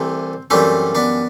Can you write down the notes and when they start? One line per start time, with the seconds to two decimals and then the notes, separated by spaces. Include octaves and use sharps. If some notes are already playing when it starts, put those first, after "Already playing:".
Already playing: C2 C3 E3 A3 C4
0.50 F#2 E3 G3 A3 C4
0.95 B3 D4